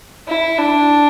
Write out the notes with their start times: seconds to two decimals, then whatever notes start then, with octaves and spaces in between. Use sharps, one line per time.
0.28 E4
0.58 D4